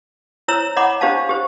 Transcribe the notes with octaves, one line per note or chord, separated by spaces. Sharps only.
E4 C5 C#5 A#5 E6
C#5 D#5 F#5 A#5 B5 D6
D4 G4 C5 D#5 F5 A5
G4 C5